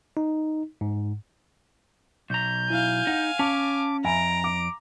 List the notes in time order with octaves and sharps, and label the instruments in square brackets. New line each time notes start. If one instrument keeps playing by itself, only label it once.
[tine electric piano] D#4
G#2
[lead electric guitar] B1 A#5 [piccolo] G6
[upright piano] E4 [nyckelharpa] F5 G#5
[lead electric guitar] D#4 [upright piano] F#5
[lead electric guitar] C#4 [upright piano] A5 [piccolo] D6
[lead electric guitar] F2 [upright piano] E5 G#5 B5 [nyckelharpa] A#5 [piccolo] D7
[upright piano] D6 [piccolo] D7